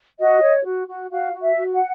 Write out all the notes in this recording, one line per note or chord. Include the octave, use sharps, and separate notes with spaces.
F#4 D#5
C#5
F#4
F#4
F#4 F5
F#4
E5
F#4
F#5